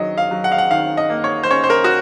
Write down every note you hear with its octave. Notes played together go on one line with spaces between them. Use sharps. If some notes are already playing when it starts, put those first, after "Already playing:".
Already playing: D#3 F#3 D#5
F5
F#3
F#5
F5
F#5
D#3 F5
D#5
A#3
C#5
C5
C#4 C#5
C5
A#4
F#4